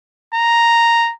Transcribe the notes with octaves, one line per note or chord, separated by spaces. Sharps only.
A#5